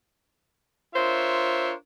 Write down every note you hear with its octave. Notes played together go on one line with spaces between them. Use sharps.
D4 F4 A#4 C5 C#5 E5